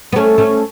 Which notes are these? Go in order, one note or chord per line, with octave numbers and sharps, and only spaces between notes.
B3
A3 C#4
A3 C#4